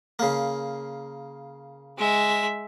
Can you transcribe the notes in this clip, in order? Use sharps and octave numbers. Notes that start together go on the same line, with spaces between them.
C#3 A#3
G#3 E5